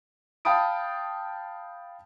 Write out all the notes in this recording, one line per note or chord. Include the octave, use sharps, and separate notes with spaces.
F5 G5 A5 B5 D#6 D7